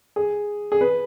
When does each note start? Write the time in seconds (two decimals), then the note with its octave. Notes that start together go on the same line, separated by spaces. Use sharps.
0.16 G#4
0.72 G#4
0.81 B4